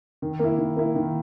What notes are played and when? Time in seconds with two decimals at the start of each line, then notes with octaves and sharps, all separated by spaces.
0.22 D#3
0.39 A#3 E4
0.58 D#3
0.76 A#3 E4
0.95 D#3